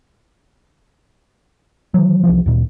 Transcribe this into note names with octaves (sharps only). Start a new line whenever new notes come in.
D#3 E3 F#3
C2 C#3 E3 F3
D2 A#2